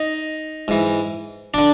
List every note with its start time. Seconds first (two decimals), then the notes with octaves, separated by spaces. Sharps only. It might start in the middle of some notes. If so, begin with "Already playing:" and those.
Already playing: D#4 D#5
0.68 G#2 E3
1.54 D3 D4 D5